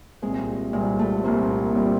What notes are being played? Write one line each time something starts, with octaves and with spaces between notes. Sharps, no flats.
C2 A#2 G3 G#3 C4
C2 A#2 G3 G#3 C4
A3
C2 A#2 G3 A#3 C4
A#2 G3 C4